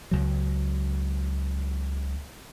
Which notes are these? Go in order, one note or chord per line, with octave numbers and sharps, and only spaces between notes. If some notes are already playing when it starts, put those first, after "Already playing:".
C#2 F#3